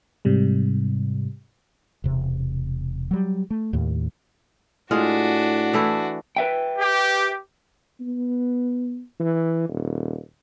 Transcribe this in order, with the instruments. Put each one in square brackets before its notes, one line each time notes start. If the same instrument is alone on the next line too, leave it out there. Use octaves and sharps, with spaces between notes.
[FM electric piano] G#2 C3 G3
[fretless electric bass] E1 C3
F#3 G3
A3
D#2 A2
[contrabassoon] A2 [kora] G#3 F4 F5 [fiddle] D4 F#4
[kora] E3 A3 E4
[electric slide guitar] B4 E5 G5
[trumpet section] G4
[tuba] B3
E3
D#1